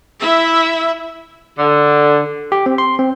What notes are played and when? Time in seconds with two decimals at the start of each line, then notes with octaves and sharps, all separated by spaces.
0.20 E4 E5
1.58 D3
2.52 G4
2.66 C4
2.78 C6
2.99 C4